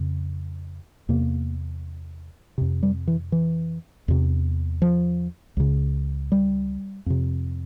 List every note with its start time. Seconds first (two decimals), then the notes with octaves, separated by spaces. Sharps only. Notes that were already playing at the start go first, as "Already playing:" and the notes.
Already playing: F2 C#3
1.09 E2 C3 A#3
2.58 F2 C3
2.83 G3
3.07 E3
3.32 E3
4.08 E2 C3
4.82 F3
5.57 C#2 C#3
6.32 G3
7.06 F2 C3